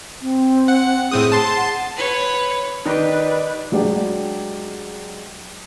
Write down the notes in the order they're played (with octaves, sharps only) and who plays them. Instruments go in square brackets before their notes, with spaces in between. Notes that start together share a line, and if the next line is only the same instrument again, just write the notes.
[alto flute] C4
[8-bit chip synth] F#5
[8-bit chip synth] A2 C4 D#6 [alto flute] G#4
[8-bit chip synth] A5 C6
[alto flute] F#5
[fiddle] B4 C#5
[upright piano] D#3 [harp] D#4 G4 [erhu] B4 [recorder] D5
[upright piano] F#3 G#3 D4 G4